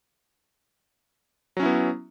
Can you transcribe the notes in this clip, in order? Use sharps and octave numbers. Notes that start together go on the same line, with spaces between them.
F#3 B3 C#4 E4